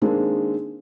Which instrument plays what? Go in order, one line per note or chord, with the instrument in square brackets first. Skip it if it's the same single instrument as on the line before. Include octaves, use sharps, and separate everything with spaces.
[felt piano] D#3 G#3 A#3 C4 D4